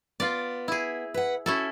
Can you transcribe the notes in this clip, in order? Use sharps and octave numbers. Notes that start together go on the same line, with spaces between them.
B3 F4 D5
E4 G#4
B4 F#5
C#4 E4 F#4 A4